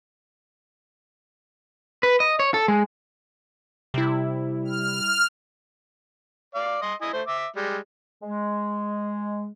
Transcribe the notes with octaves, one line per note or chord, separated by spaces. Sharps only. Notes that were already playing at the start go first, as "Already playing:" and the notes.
B4
D#5
C#5
A4
G#3
C3 G3 E4
F6
D5 F5
D#5 C6
E4 D#5 G#5
A3 C5
E5 D6
G3 G#3
G#3